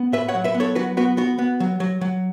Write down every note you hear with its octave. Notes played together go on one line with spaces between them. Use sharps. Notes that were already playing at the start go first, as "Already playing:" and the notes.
Already playing: B3
A2 B4 E5
C#5 F#5
F#3
B4 E5
B3
A4 C#5
F#3 F#4 B4
B3 F#4 B4
B3 F#4
B3
F#3
F#3
F#3